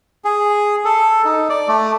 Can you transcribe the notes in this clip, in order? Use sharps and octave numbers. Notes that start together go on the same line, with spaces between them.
G#4
A4
D#4
D5
A3